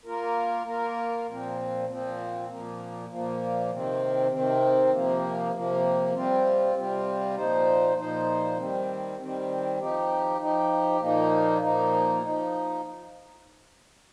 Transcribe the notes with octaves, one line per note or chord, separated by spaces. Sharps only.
A#3 F4 A#4
A#3 F4 A#4
A#2 F3 C4
A#2 F3 C4
A#2 F3 A#3
A#2 F3 A#3
C3 D#3 C4
C3 D#3 C4
C3 F3 A#3
C3 F3 A#3
C3 G3 C4 F4
C3 G3 C4 F4
A#2 F3 D#4 C5
A#2 F3 D#4 C5
D#3 G3 C4
D#3 G3 C4
F3 D#4 G4
F3 D#4 G4
A#2 F3 A#3 D#4
A#2 F3 A#3 D#4
F3 D#4